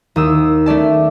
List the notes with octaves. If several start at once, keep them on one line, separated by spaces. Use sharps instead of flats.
D#2 D#6 E6
A3 C#4 D5 A5